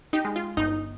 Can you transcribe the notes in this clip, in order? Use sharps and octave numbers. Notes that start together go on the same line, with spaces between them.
D#4 G4
G#3
F4
G1 D#4